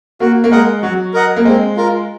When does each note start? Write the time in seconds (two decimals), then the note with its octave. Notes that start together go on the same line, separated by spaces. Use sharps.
0.20 A#3 F#4
0.44 A#3
0.51 G#3 A#4 D#5 F#5
0.83 F#3 F#4
1.14 A#4 D#5 F#5
1.36 A#3
1.45 G#3 C4
1.76 F4 A#4